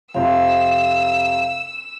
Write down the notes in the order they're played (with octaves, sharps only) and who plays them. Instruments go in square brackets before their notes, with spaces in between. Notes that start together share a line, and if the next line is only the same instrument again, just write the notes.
[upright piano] F2 C3 C4 [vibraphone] F5 [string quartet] E6